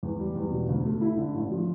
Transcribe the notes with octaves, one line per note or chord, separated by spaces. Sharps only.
E2
G3
E2
B2
D2
A3
E4
D3
A1
F3